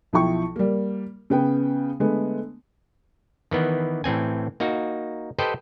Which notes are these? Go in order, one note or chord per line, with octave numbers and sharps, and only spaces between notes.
B1 F3 E4 G5 C#6
G3 A#3
C#3 B3 G5
D3 G#3 A3 B3
D#3 E3 B3
A2 E3 C4 G#5
A#3 D#4 F#4
G4 A4 B4 C5 D#5 G5